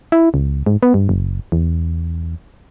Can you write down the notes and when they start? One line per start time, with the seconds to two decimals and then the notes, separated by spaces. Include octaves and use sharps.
0.12 E4
0.34 C#2
0.66 G#2
0.83 B3
0.94 G2
1.09 F#1
1.52 E2